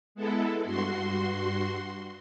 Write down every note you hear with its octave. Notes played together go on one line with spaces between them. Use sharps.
G#3 B3 E4 A4
G2 F#4 C6